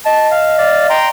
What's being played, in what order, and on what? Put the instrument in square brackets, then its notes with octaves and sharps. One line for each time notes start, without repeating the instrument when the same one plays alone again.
[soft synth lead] D#5 [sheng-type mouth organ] A5
[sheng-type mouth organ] F5
D5 F5
G5 A#5 C6